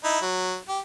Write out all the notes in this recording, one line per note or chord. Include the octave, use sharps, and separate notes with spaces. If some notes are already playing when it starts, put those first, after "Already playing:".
D#4 E4
F#3
G4